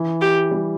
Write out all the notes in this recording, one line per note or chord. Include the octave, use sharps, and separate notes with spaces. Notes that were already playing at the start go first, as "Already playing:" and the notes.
Already playing: E3
G4
G3